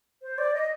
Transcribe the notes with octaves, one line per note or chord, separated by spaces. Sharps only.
C5
D5
D#5